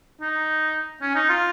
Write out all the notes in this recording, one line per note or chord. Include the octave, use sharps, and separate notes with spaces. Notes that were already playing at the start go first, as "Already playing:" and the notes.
D#4
C#4
D#4
F4